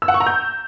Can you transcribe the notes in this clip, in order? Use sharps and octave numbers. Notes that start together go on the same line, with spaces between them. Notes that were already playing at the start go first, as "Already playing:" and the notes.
E6
F#5
C#6
A#5
G6